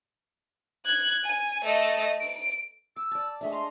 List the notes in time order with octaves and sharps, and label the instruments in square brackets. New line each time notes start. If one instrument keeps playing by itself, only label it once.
[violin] F#6 G#6
G#5
A3 D#5
D7
[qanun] D6 [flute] E6
[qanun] D5 A5
[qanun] G#3 A3 D4 [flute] E5
[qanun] A#5 [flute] C6